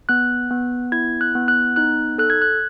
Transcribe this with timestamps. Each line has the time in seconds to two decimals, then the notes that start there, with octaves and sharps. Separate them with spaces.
0.09 B3 F#6
0.51 B3
0.92 E4 G#6
1.21 F#6
1.35 B3
1.48 F#6
1.76 D#4 F#6
2.18 A4 F#6
2.30 G#6
2.42 F#6